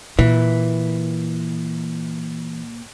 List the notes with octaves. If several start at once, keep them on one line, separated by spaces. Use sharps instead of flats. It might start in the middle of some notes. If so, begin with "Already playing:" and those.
A#2 E3